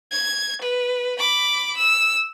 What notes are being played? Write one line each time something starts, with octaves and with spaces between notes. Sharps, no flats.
G#6
B4
B5 D6
E6